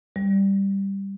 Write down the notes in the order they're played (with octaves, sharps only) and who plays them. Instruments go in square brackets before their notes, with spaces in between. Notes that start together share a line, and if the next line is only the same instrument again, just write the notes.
[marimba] G3